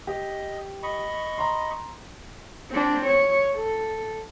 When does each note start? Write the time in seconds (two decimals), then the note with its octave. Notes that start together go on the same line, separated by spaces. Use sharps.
0.07 G4 D#5
0.83 D#5 B5 C#6
1.38 A#5 C6
2.71 C4 D4
3.06 C#5
3.56 A4